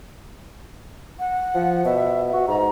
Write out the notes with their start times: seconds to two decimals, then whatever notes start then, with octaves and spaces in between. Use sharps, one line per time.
1.19 F#5
1.55 F3
1.85 B2 E5
2.33 F#4
2.48 G#2 A#5